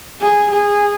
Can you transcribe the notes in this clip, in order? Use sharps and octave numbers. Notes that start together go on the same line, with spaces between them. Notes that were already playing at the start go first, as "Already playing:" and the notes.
G#4
G#4